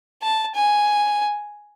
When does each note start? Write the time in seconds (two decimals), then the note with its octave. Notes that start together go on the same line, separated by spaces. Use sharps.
0.22 A5
0.55 G#5